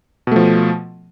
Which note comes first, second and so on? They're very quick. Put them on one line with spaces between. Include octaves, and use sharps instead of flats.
B2 A3 F3